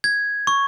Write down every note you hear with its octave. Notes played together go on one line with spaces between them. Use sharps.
G#6
C#6